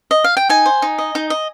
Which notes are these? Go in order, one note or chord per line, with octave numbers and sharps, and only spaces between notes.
D#5
F5
G5
D#4 G#5
C5
D#4
D#5
D#4
D#5